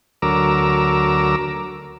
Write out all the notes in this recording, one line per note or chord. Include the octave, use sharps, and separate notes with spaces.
D2 F#3 A#4 A#5 D6 E6